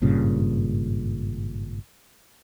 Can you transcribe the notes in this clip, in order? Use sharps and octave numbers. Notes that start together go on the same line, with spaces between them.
G#1 G2 A#2 C#3